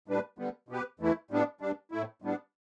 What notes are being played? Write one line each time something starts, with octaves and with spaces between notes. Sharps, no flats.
A2 G3 D4 B4
D3 G3 B3
B2 B3 G4 B4
E2 E3 A3 E4
A2 G3 B3 D4
G2 G3 D4
A2 A3 E4
A2 G3 B3 D4